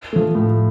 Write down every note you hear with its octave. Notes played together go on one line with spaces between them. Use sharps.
F3 A3
A2